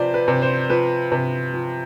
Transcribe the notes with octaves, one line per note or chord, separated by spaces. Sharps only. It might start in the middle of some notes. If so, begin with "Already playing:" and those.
Already playing: C3 F3 B4 C5 D5
B4
C3
C5
F3 B4
C3
F3